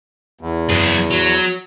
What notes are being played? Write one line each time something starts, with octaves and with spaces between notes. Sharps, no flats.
E2
F#2 G#4
F#3